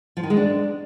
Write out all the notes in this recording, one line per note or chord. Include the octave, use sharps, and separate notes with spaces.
F3
D#3
G#3
D4